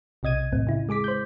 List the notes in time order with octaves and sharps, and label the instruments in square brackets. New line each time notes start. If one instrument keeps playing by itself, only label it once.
[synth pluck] B1 C3 D#5 G#6 D#7
E2 A2 C4
C#3 E4
G#3 G#4 D6 B6
C5 G6